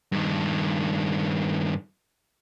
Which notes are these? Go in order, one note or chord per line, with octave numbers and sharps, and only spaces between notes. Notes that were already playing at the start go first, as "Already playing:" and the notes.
G2 D#3